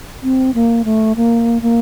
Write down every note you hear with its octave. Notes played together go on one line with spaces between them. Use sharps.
C4
A#3
A3
A#3
A#3